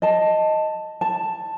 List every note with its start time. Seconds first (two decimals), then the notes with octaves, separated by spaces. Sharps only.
0.02 D#5 A5
1.01 A5